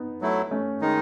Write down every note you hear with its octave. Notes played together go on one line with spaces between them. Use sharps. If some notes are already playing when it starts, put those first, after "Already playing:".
Already playing: B3 D#4
F#3 A3 E4
A3 C#4
D#3 G#3 D#4